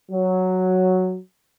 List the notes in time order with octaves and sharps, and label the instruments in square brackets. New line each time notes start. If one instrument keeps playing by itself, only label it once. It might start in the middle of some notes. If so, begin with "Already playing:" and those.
[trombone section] F#3